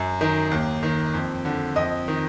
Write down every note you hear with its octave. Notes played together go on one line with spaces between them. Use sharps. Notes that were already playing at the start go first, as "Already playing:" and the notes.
Already playing: F#2
D#3
D#2
D#3
F2
D3
F2 D#5 D#6
D#3